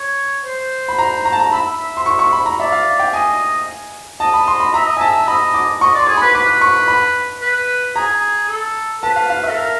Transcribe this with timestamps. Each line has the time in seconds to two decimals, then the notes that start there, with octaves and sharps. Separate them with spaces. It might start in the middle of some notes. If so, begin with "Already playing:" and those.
Already playing: C#5
0.45 C5
0.88 B5
0.98 A#5
1.25 A#5
1.32 A5
1.40 A#5
1.52 E5 B5
1.77 E5
1.97 C6
2.06 C#6
2.19 C#6
2.33 B5
2.46 A#5
2.59 D5 E5
2.72 F5
3.00 G5
3.13 D#5 G#5
4.20 D#5 A5
4.33 B5
4.47 C6
4.60 B5
4.74 E5 A#5
4.86 D#5
4.97 E5 G#5 A5
5.28 D#5 B5
5.54 D6
5.81 D#5 C#6
5.94 D5 C6
6.08 G#4
6.17 B4 B5
6.35 B4 D6
6.61 C#6
6.88 B5
7.42 B4
7.96 G#4 A#5
8.49 A4
9.03 B4 A5
9.16 F5
9.30 F5
9.43 E5
9.49 A4
9.57 A#4